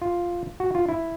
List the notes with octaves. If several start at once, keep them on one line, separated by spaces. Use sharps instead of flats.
F4
F#4
F4
E4